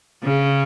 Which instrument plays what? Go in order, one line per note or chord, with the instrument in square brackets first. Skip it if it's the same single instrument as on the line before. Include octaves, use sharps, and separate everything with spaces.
[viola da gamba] C#3